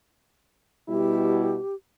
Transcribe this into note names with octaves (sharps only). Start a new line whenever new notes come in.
B2 G3 E4 G4